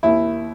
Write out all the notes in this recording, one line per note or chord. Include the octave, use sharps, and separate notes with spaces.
D#2 E4